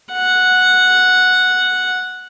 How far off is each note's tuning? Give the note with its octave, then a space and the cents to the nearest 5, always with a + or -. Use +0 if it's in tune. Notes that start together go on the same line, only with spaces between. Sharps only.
F#5 -5